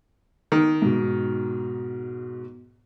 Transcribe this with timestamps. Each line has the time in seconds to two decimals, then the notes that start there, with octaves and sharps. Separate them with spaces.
0.52 D#3
0.82 G#2 B2